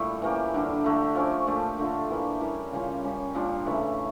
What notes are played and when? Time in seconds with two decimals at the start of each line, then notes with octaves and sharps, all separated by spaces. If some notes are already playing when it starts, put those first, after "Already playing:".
Already playing: A#2 G3 A3 E4
0.22 E3 A#3 C#4 G4
0.54 D3 G3 D4
0.84 D3 A3 E4
1.15 F3 C#4 G4
1.47 A#2 A3 D4 G4
1.79 D3 A3 D4 F4
2.10 E3 A#3 E4
2.41 G3 A#3 C#4 E4
2.72 C#3 G3 C#4 F4
3.03 G3 C#4 G4
3.35 A#2 G3 D4 F4
3.66 C#3 E3 A3 E4